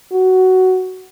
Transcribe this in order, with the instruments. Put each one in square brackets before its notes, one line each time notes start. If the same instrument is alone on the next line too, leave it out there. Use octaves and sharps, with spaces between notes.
[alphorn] F#4